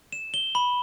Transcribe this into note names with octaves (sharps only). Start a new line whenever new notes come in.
E7
G7
B5